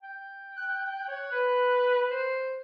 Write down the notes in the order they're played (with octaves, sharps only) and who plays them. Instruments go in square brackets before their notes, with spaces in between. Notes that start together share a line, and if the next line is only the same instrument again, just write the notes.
[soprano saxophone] G5
[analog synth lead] F#6
[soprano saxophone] C#5
B4
C5